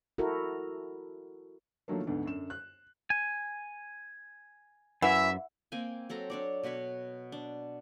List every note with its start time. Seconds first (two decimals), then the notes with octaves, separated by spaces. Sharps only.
0.18 E4 F#4 A4 A#4
1.88 D3 D#3 F3 F#3 A3 A#3
2.07 D2 G#2 D3 B3
2.25 F#2 D3 E7
2.50 F#6
3.10 G#5
5.02 F#2 E3 E5 F#5
5.72 A#3 C4 G5 G#5
6.09 F#3 C4 A4 A#5
6.30 D4 C#5 D5
6.63 B2 F#4 B4 C#5
7.32 D4